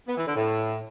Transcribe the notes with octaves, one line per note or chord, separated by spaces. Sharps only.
B3
E3
D3
A2